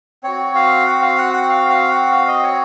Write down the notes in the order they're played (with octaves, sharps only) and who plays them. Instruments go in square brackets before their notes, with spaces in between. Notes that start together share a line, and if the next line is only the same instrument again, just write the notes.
[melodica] C4 F#4 C#5
F5
F#5
F5
F#5
F#5
F5
F5
F#5
F5
D#5
C#5